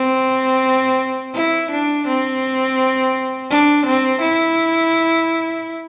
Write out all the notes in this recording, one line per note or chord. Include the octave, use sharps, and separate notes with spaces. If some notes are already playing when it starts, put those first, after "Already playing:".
Already playing: C4
E4
D4
C4
D4
C4
E4